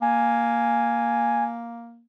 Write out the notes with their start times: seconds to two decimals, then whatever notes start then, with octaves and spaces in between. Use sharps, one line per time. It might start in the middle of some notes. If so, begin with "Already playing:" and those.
0.02 A#3 G#5